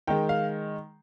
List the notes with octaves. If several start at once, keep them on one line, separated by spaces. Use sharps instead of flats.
D#3 G#3 G5
F5